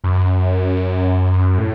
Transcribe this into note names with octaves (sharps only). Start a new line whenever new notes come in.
F#2
A2